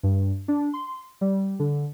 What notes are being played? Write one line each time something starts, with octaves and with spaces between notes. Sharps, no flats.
G2
D4
C6
G3
D3